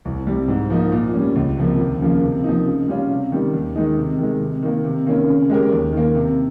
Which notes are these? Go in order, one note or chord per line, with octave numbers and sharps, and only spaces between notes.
C2
C3 G3
G#2
F3 A#3 D#4
A#2
G3 C#4
C#2
C3 F3 A#3
D#2
C#3 F3 A#3
C3
F3 A#3 D#4
C#3
G3 C#4 F4
C3
D#3 G3
D#2
D#3 G#3 D#4
C3
D#3 G#3
C3
D#3 A#3
C3
D#3 A#3 C#4
C#3
G#3 C#4 G4 A#4
D#2
D#3 A#3
C3